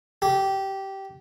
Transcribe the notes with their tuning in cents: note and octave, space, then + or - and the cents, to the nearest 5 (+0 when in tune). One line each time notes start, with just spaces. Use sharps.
G4 -15